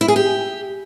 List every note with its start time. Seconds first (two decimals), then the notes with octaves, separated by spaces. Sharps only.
0.01 E4
0.08 G#4
0.16 G4